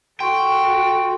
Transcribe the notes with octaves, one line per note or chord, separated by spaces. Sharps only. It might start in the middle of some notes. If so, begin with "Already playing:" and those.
F#4 A4 G5 C6 C#6